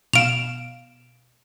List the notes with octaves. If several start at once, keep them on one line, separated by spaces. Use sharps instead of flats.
B2 F5 D7 E7 F7